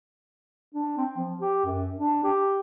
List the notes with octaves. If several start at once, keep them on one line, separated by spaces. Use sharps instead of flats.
D4
C4
F3
G4
F#2
D4
G4